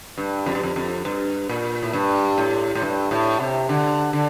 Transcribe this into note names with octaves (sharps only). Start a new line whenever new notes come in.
G2
F2
G2
F2
F2
G2
A#2
A2
G2
A2
A2
G2
A2
C3
D3
D3